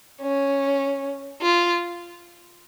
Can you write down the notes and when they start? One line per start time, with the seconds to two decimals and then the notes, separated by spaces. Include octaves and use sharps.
0.21 C#4
1.42 F4